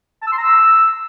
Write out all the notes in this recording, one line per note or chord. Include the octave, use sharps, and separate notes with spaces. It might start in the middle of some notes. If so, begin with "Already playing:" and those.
A5
E6
C6
A#5
E6